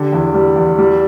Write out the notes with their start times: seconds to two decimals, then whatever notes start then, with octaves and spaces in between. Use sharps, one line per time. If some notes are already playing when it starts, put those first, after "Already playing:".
Already playing: D3 G4
0.13 E2
0.34 G3
0.56 E2
0.78 G3